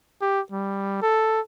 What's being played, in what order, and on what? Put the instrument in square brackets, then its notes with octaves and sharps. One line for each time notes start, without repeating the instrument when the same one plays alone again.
[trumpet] G4
G3
A4